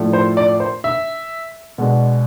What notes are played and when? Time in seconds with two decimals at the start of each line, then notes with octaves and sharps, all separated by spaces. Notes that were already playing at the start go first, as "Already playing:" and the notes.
Already playing: A2 F3 A3 D4
0.13 C5
0.37 D5
0.60 C5
0.84 E5
1.78 B2 G#3 D4